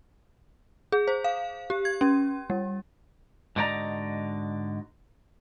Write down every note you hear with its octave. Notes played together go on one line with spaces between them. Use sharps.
G#4
C5
F5
G4
G#6
C#4
G3
G#2 D3 F#4 D5 D#5 A#5